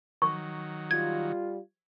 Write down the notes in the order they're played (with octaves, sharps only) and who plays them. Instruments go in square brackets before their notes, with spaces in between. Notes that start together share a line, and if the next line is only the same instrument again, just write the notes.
[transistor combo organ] D#3 F#3 [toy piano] C#6
[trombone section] G3 F4 [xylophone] G#6